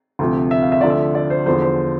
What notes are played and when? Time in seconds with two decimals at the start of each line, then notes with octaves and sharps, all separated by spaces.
0.19 D2 C3 F3
0.51 E5
0.62 F5
0.72 E5
0.81 D2 D3 F3 D5
0.90 E5
1.15 D5
1.30 C5
1.46 E2 D3 F3 C5
1.62 C5